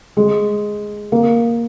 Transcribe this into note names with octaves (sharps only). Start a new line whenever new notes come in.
G#3
A#3